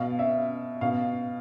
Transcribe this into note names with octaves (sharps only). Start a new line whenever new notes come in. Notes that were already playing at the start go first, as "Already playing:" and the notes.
Already playing: B2 F5
E5
B2 F5